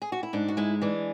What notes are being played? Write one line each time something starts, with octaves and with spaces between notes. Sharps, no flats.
G#4
F#4
E4
G#2 D4
F#4
G#3 E4
E3 D4